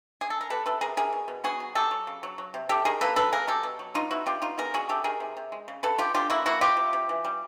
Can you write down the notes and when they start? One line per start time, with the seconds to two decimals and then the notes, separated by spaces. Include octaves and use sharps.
0.21 G#4
0.30 A4
0.41 A#4
0.50 G3 A4 B4
0.66 C3 A4 B4
0.81 C3 G#4 A#4
0.97 C3 G#4 A#4
1.13 B2
1.28 B2
1.44 B3 F#4 G#4
1.60 F#3
1.75 F#3 G4 A4
1.91 F#3
2.07 C#3
2.23 F#3
2.38 F#3
2.54 C3
2.69 C3 G4 A4
2.85 D#3 G#4 A#4
3.01 A#3 A4 B4
3.16 F#3 A4 B4
3.32 A#3 G#4 A#4
3.47 F#3 G4 A4
3.63 B2
3.79 F#3
3.94 B2 D#4 F4
4.11 B2 E4 F#4
4.26 B2 F4 G4
4.42 B2 D#4 F4
4.58 B3 G#4 A#4
4.74 B2 F#4 G#4
4.89 C3 G4 A4
5.04 D#3 G#4 A#4
5.20 C3
5.37 C3
5.52 G#3
5.68 C#3
5.83 C#3 A4 B4
5.98 F3 F4 G4
6.14 D3 F4 G4
6.30 A#3 E4 F#4
6.46 A#3 E4 F#4
6.61 F3 F4 G4
6.77 C3
6.93 C3
7.09 E3
7.24 G3